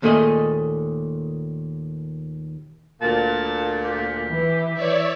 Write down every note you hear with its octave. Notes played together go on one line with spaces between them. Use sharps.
D#2 A#2 A3 D4 G#4 D#5
D2 A#2 A5
G4
E3
C#5 D5 E5